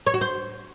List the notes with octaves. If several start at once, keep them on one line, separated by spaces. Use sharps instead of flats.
C#5
F#4
C5